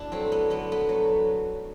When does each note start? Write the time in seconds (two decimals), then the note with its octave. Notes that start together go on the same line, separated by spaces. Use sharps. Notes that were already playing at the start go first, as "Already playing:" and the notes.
Already playing: D4 E4 F#4
0.12 F#3 A3 C4
0.32 B3
0.50 D3 B3
0.72 B3
0.89 F#3 A3